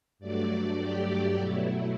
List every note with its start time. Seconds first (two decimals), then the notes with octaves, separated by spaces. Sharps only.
0.19 G2 F#3 A3 D5
0.78 G4
1.36 B2 F#3 A3 E4